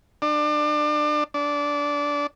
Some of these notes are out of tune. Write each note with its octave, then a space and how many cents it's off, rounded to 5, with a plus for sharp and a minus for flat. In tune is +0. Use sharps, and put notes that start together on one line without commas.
D4 +30
D4 -15